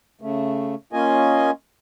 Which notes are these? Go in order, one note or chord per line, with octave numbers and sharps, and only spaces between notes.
C#3 A3
A#3 C#4 F4 D#5 G#5